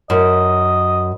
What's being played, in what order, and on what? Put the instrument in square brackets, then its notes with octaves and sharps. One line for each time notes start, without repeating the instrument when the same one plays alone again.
[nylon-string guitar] F#2 [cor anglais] D#5